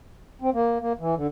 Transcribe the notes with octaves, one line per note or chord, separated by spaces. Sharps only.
C4
A#3
A#3
E3
D3